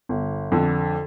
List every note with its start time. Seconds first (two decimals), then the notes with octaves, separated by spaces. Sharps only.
0.09 G1
0.52 F2 D3